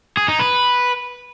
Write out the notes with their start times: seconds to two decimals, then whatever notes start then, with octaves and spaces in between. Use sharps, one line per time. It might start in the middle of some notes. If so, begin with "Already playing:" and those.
0.17 G#4
0.28 D#4
0.39 B4